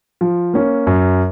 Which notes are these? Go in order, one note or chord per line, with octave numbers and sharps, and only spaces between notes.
F3
A#3 C#4
F#2